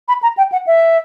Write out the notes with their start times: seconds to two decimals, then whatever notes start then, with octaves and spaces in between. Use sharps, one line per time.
0.08 B5
0.23 A#5
0.37 G5
0.52 F#5
0.67 E5